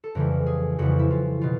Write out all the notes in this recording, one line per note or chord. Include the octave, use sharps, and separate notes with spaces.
A4
F2 C#3 E3 G3 A#4
G#4
F2 C#3 E3 G3 F#4
E4
F4
B2 F4